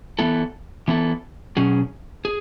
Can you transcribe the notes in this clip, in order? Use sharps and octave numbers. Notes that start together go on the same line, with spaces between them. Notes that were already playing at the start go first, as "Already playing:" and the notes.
E3 B3 E4 A4
E3 B3 E4 A4
B2 F#3 C#4 G#4
G#4